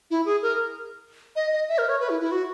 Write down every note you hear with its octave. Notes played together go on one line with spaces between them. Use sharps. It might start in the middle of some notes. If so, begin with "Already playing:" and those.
E4
G#4
A#4
D#5
D#5
E5
A#4
C#5
B4
E4
E4
F#4